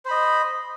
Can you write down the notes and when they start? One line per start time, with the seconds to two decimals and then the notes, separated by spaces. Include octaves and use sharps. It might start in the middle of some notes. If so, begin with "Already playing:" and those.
0.05 C5
0.08 B5
0.11 D#5